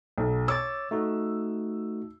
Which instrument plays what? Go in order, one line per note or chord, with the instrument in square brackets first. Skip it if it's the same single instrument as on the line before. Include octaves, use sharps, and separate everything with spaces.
[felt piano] B1
[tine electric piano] C#5 D6 A6 [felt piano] E6
[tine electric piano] A3 D#4 F#4